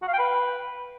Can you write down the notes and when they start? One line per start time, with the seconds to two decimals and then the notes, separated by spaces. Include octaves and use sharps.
0.02 F#4
0.08 F5
0.13 G5
0.19 B4